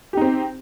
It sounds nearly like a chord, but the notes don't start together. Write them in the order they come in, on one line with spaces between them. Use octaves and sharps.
G4 D#4 C4